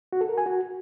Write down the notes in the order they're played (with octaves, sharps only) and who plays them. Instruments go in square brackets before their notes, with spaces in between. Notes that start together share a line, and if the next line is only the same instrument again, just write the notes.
[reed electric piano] F#4
A4
A#4
G#5
F#4